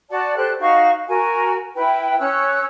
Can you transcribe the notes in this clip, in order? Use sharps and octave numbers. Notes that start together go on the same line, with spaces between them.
F#4 D5 F#5 A5
G4 A4 C5 F#6
D#4 F#4 F5 C#6
F#4 A#4 G#5
E4 B4 G5
C#4 C#5 E6 F#6